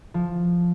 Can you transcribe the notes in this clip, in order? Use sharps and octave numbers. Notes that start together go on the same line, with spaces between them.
F3